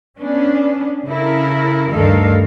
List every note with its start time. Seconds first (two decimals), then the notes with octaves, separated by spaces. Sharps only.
0.20 B3 C#4 D4
1.07 C#3 E4 A4 A#4
1.92 D2 G2 D#3 A4 A#4 F5